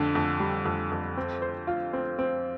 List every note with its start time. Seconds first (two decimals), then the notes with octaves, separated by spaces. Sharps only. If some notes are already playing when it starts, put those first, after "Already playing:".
Already playing: F2 D3
0.15 F2
0.40 G3
0.65 F2
0.91 F2
1.17 C4
1.42 C5
1.67 F4
1.93 C4
2.19 C4